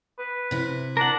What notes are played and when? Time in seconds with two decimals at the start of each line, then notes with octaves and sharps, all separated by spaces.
0.18 B4
0.51 C3 E4
0.97 D4 A#4 F#5